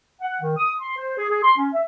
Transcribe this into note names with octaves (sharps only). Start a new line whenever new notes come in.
F#5
D#3
D#6
C6
C5
G#4
G#4
C6
C#4
E5